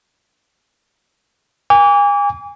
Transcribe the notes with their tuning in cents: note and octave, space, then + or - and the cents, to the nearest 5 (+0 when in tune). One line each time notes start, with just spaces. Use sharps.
G#5 -35 D6 -35